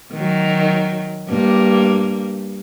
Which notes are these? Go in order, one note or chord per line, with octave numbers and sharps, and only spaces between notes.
D#3 F#3
G2 A#3